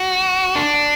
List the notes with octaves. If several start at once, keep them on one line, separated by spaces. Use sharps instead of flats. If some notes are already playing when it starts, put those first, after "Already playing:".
Already playing: F#4
D4